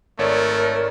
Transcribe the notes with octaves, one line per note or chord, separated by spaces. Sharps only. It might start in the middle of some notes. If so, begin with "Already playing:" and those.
G#1 A3 A#4 C#5 D5